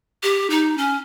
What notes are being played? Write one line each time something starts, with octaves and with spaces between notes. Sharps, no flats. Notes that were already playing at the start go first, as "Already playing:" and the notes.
G4
D#4
C#4